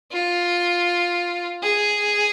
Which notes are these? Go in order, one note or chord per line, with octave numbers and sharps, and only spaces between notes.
F4
G#4